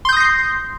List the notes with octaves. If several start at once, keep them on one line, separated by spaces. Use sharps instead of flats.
C6 D#6 G6 A#6 C7